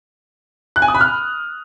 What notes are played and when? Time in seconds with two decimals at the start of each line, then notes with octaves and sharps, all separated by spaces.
0.76 F#6
0.82 G#5
0.88 D#6
0.95 B5
1.01 F6